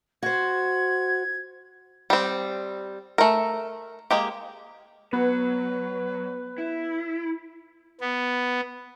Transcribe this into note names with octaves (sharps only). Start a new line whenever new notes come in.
F#4 C5 G#6
G3 C4
A3 A#4
G#3 A#3 G4
F#3 B3 B4
E4
B3